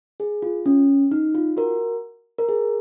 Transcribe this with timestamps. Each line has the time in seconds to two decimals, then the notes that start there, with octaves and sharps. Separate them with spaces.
0.20 G#4
0.42 F4
0.66 C#4
1.11 D#4
1.35 F4
1.57 F#4 A#4
2.38 A#4
2.49 G#4